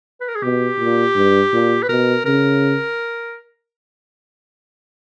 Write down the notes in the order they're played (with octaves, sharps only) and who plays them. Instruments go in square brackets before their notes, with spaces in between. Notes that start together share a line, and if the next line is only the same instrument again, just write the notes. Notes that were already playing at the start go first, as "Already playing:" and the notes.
[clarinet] B4
A#4
G#4
[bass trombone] B2 [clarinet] G4
[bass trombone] A#2
G2
A#2
[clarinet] B4
[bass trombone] B2 [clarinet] A#4
[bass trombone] C#3 [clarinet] A#4